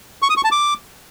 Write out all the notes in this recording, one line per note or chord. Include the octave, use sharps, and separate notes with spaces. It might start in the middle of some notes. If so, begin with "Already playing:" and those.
C#6
D#6
C#6
A5
D6